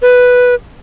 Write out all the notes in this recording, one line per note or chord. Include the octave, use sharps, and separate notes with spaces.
B4